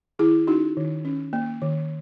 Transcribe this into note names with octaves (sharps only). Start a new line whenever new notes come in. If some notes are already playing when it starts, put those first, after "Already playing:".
D#3 E4 G#4
C#4 D#4 F#4
D#3
C#4
A#3
D#3